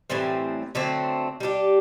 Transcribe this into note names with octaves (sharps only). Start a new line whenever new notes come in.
A2 E3 G3 C4
D3 F#3 A3 C4
G3 D4 G4